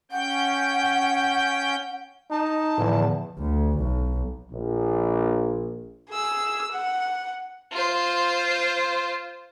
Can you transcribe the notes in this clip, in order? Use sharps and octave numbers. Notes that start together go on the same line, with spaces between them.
C#4 F#5 G5 G6
D#4 A5
E2 A2 D3 F3
D2
B1
A#1
G#4 E6
F#5
F4 C5